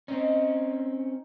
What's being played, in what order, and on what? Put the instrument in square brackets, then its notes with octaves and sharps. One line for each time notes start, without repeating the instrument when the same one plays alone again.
[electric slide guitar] C4 C#4 [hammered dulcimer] D#4